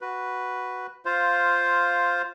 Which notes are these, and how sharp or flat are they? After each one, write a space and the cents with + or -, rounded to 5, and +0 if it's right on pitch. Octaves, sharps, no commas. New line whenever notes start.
F#4 +0 B4 +0
F4 +5 C5 +0 F5 +0